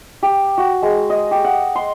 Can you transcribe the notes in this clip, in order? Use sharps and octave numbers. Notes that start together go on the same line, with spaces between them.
G4
F#4
G#3
D#5
G4
F#5
C6